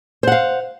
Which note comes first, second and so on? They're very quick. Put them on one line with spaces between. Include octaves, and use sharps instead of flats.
C5 F#5 F5